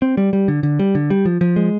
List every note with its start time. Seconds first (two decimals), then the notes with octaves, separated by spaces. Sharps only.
0.02 C4
0.17 G3
0.33 G3
0.48 D3
0.63 D3
0.79 G3
0.95 D3
1.10 G3
1.25 F3
1.41 F3
1.56 G#3